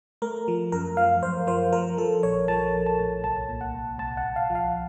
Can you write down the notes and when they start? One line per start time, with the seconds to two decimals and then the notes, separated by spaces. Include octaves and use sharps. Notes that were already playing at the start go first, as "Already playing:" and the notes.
0.22 A3 A#4
0.48 F3
0.72 F#2 A#4
0.97 F3 F5
1.22 F#2 C5
1.47 F3 C5
1.72 F3 A#4
1.97 F3 A4
2.23 A#1 C#5
2.48 F3 A5
2.74 A#1
2.86 A5
2.99 A2
3.24 C2 A5
3.49 A#2
3.61 F#5
3.74 C2
3.98 C2 A5
4.17 F#5
4.24 C2
4.36 F5
4.50 F3
4.55 F5